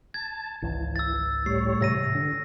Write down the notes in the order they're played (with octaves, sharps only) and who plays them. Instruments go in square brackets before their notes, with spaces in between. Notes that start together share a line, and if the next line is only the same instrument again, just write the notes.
[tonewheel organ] A5 [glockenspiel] G#6
[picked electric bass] G#1 C#2 [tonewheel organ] E3
[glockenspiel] E6 A6
[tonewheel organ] A2 G3 C#5 [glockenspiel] C7
[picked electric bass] G#2 C3 E3 [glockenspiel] E6 A#6 D#7
[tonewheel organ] D3